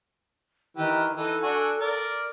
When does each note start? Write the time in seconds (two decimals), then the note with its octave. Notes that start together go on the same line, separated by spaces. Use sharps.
0.77 D#3 E3 G4
1.16 E3 D#4 A4
1.42 D4 F#4 G#5
1.80 A#4 D5